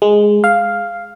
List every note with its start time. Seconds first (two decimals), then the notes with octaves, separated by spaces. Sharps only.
0.02 G#3
0.44 F5